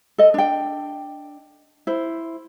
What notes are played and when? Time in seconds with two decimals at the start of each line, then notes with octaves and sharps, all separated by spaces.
0.18 A4 D#5
0.34 D4 G5
1.87 E4 C5